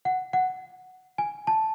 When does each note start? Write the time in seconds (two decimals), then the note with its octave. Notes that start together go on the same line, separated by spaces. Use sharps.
0.05 F#5
0.33 F#5
1.18 G#5
1.47 A5